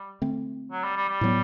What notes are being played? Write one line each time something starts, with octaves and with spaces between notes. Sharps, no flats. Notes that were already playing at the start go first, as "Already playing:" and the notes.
Already playing: G3
D3 A3 C4
F#3
G3
G3
G3
A2 F#3 B3